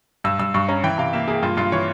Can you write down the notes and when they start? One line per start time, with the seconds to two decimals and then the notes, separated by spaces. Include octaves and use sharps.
0.24 G2 E6
0.39 G2 E6
0.54 G2 C#6
0.69 C#4 A#5
0.83 E3 G5
0.98 C3 F5
1.13 A#3 E5
1.28 A#3 G#4
1.42 G2 F4
1.57 G2 F4
1.72 E3 C#5